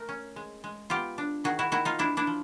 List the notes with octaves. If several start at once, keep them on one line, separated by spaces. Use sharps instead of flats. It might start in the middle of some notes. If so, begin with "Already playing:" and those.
Already playing: A3 A#4
C#4
G#3
G#3
B3 F4 G4
D4
D#3 F#4 G#4
E4 F#4
D#3 E4 F#4
D#4 F4
A3 D4 E4
D4 E4
F3